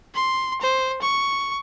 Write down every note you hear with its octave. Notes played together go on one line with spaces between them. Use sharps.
C6
C5
C#6